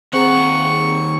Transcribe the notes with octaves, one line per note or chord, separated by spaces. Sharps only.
D#2 C4 G#4 F#5 A#5 C#6